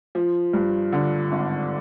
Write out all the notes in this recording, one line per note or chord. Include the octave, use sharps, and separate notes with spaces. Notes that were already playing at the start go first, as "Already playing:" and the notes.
F3
G2
D3
G#1